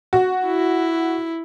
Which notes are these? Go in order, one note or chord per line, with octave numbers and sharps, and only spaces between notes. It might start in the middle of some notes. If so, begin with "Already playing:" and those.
F#4
E4